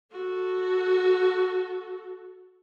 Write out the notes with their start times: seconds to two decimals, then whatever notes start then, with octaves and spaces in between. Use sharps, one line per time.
0.12 F#4 A4